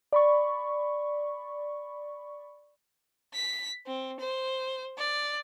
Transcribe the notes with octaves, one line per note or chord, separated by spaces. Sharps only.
D5 B5 C#6
B6
C4
C5
D5